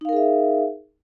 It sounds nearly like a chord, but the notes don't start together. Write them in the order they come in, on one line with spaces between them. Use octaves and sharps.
D#4 F5 A#4 G#4 E5